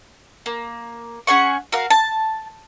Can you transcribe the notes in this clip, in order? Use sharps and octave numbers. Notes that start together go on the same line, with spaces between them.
A#3
C#4 G#4 F#5 C#6
F#4 A#4 F5
A5